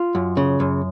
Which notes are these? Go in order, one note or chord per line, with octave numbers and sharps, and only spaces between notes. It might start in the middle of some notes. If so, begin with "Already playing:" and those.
Already playing: F4
F#2
C#3
F#2